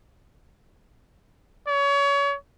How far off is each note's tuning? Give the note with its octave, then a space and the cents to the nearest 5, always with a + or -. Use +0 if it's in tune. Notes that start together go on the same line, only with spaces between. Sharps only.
C#5 +30